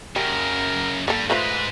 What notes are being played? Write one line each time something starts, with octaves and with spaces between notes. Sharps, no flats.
F#2 C#3 G3 A#4
G2 G3 A#3 A4
G#2 G#3 A3 F4 B4 C5